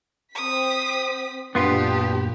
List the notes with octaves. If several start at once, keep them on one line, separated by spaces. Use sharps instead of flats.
C4 D#6 B6
F#2 A#2 B3 D4 F4 G4 B4